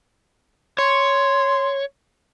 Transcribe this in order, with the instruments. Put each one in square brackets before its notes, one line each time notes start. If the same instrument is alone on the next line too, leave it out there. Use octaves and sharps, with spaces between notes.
[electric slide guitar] C#5 [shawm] C6